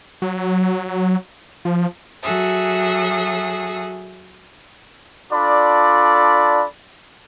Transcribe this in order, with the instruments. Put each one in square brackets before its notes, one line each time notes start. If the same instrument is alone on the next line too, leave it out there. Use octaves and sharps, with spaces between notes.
[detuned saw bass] F#3
F3
[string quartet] F#3 F#4 G#4 A4 E5 D#6
[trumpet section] D4 F4 A4 D5 B5